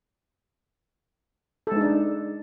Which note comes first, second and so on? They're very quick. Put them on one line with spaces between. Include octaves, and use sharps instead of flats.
A4 G#3 D#4 D4